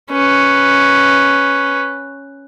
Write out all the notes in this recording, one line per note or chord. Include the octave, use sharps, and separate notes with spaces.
C#4 B4